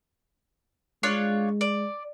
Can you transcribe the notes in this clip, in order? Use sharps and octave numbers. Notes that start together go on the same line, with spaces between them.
G#3 D4 F4 C#5
D5